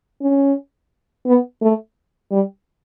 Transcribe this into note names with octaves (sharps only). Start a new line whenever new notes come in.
C#4
B3
A3
G3